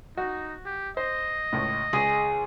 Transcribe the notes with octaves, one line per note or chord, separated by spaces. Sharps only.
D#4 F#4
G4
C5 D#5
C#2 A2
C#2 G#4